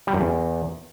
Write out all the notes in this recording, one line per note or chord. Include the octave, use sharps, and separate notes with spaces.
G3
F#2
E2